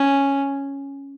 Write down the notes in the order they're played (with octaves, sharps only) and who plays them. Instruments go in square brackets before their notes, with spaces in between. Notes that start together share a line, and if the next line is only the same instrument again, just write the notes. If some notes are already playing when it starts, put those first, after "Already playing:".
Already playing: [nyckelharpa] C#4